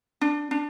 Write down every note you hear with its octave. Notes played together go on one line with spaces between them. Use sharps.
D4
D4